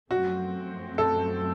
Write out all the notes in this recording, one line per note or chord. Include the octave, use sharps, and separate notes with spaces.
F#2 F3 A3 C4 F#4
A4